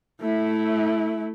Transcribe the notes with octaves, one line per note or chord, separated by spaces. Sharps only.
A3 E4